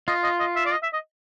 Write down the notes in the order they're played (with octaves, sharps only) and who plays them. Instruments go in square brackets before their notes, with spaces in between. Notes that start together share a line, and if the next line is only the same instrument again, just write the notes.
[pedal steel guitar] F4 [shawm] D#5
[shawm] D#5
D#5
E5
D5
D#5
E5
D#5